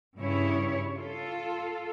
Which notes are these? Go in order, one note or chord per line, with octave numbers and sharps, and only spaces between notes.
G2 C#3 E4 C#5
F4 A4